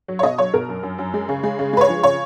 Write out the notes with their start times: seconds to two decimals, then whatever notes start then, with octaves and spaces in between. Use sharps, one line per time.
0.08 F#3
0.19 C#5
0.23 B2 D#5
0.38 F#3 C#5
0.54 B2 A#4
0.69 F#2
0.83 F#2
0.98 F#2
1.14 G#3
1.29 C#3
1.43 G#3
1.59 C#3
1.73 G#3 B4
1.81 C#5
1.88 F3
2.03 C#3 C#5